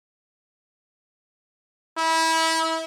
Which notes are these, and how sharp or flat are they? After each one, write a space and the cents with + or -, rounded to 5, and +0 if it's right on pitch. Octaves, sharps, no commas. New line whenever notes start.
E4 -25